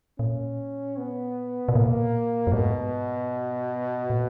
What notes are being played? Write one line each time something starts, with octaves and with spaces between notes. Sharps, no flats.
A#2 C#4
B3
B2
A#2 A#3
F#2
G#2 B2
A#2